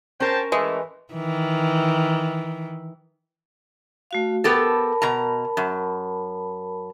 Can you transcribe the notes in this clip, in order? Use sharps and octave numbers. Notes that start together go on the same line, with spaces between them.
C#4 A#4 C5 G5 A5
E3 G#3 A3 B4
D#3 E3
A3 F#4 F5
B3 G4 A4 A#4 A5 B5
B2 A#5
F#2